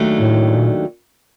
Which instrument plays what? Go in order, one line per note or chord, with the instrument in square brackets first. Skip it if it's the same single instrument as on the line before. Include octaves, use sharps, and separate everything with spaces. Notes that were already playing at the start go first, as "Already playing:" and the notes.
Already playing: [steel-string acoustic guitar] D#2 D#3 F#3 A3 D4
[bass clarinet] A2
A#2